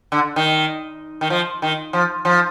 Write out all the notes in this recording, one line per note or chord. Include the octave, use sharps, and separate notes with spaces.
D3
D#3
D#3
F3
D#3
F3
F3